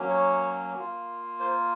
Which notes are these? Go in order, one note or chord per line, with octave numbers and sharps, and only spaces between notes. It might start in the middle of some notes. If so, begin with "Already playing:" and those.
Already playing: F#3 A#3 C#4
C#5
A#3 F4
C5